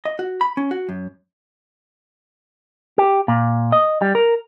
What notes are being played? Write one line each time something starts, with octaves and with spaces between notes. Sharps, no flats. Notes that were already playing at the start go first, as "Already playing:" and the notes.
D#5
F#4
B5
C#4
F#4
F#2
G4
A#2
D#5
G3
A#4